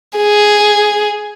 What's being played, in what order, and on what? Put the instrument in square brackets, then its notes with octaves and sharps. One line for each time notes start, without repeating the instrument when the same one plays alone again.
[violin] G#4